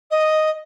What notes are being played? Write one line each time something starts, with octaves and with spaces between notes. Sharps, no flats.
D#5